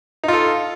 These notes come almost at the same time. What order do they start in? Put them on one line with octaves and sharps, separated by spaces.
D#4 F4 A4